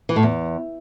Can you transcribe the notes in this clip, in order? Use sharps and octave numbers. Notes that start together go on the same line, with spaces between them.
E3
A2
E2